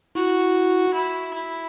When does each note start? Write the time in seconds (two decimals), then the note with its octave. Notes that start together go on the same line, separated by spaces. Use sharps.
0.15 E4 F#4
0.94 E4
1.34 E4